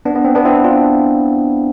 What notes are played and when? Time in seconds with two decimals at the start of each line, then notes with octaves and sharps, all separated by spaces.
0.05 B3 D4
0.15 B3
0.25 C4
0.35 B3 D4
0.45 C4 E4
0.64 D4 F4